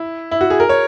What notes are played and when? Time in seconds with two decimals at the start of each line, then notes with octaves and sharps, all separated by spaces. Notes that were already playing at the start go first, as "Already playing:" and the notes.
Already playing: E4
0.31 E4
0.41 F#4
0.50 G#4
0.60 A#4
0.69 C#5